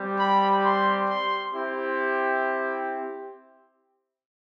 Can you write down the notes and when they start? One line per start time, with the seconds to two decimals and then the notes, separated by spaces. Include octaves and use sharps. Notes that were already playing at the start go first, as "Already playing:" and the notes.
Already playing: G3 C4 G4
0.17 B5
0.63 C6
1.08 C6
1.53 C4 E4 G4